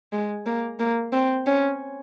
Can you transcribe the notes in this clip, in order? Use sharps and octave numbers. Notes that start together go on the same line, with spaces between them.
G#3
A#3
A#3
C4
C#4